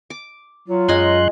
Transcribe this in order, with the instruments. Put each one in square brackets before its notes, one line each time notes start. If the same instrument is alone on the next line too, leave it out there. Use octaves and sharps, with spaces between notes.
[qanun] D6
[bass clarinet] F#3 [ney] F4
[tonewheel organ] F#2 C6 F#6 [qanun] G#3 D#5 G#5